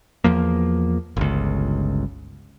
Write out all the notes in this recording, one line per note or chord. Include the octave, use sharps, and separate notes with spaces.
E2 F3 A#3
G1 C#2